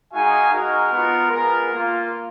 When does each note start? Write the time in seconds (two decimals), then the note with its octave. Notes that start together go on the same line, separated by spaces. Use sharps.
0.13 G#3 D#4 F#4 F5 G#5
0.52 G#3 D#4 F#4 A#4
0.92 B3 F4
1.31 G#3 B3 F4 A#4
1.72 A#3 F4